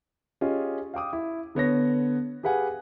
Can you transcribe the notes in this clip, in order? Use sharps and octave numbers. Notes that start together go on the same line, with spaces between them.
C#4 F4 G4 G#4 D#5
F5 G5 D6 D#6
E4
D3 B3 C#5 A#6
G4 G#4 B4 F5 F#5 G#5